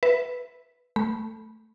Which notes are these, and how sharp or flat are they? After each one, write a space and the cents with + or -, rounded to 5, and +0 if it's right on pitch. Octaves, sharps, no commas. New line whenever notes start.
B4 +0 E5 +0
A3 +0 B5 -15